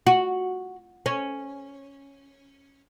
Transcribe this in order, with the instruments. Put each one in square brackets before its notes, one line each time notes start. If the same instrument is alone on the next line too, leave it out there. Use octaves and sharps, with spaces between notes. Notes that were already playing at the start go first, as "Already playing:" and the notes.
[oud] F#4
C#4